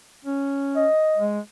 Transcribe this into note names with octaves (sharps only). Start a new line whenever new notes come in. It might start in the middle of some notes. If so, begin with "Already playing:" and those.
C#4
D#5
G#3